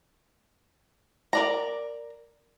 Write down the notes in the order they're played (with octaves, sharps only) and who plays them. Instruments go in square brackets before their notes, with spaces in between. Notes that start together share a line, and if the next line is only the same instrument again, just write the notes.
[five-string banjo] A#4 D5 A#5